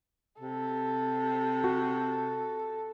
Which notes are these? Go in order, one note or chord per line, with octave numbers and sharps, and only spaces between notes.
C3 A4
F#4